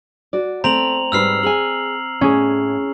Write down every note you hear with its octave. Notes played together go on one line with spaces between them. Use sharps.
F#4 D5
A3 C4 A#5 F7 F#7
G#2 G3 B4 E6 F6 C7
G#4 G5 G#5 F#7
A2 C#4 G#4